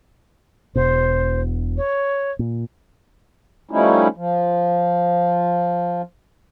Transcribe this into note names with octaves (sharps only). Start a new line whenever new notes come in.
E1 B2 C5
C#5
A#2
F3 G3 A3 C#4 D#4 E4
F3